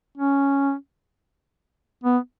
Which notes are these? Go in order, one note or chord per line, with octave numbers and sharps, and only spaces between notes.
C#4
B3